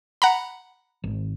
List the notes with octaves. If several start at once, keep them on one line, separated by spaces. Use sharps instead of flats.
F#5 A#5 B5
G#1